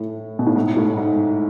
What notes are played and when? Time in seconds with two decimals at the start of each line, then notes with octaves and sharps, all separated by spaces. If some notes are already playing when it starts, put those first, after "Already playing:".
Already playing: A2
0.39 B2
0.47 A2
0.56 G#2
0.76 A2
0.97 G#2